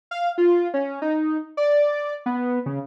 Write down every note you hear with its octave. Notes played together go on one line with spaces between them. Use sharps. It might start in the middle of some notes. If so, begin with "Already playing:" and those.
F5
F4
C#4
D#4
D5
B3
C#3